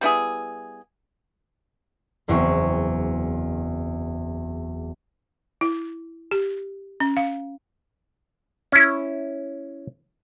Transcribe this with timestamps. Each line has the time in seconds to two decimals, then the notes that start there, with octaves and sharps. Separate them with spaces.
0.01 G3 B3 E4 G#4
2.28 F#1 E2 C4 C#6
5.61 E4
6.31 G4
7.00 C#4
7.17 F5
8.72 C#4 E4